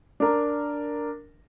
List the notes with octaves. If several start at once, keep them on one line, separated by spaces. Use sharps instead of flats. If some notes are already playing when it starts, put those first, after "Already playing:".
D4 A#4